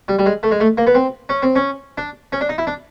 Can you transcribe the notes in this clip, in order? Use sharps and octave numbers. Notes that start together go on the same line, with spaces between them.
G3
G3
G#3
A3
G#3
A3
A#3
B3
C4
C#4
C4
C#4
D4
C#4
D4
D#4
E4
D4